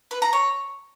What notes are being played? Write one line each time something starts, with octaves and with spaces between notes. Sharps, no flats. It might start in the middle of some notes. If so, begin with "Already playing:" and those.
B4
A#5
C#5